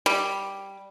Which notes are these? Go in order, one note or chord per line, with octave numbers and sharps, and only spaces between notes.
G3